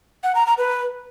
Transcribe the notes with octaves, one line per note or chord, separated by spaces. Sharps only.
F#5
A#5
A#5
B4